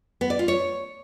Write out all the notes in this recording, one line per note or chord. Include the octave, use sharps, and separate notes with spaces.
B3
D5
F4
C#5